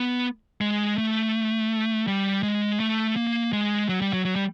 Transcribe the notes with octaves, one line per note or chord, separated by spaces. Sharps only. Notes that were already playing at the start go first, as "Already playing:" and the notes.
Already playing: B3
G#3
A3
G3
G#3
A3
A#3
G#3
F#3
G3
F#3
F#3
G3